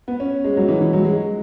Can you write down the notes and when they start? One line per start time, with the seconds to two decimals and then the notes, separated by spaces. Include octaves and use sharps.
0.08 B3
0.20 C#4
0.44 G#3
0.57 F#3
0.68 E3
0.81 E3
0.93 F#3
1.05 G#3